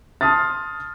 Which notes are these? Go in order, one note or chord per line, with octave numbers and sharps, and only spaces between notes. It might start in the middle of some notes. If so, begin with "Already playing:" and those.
A5 C6 D#6 F6 A6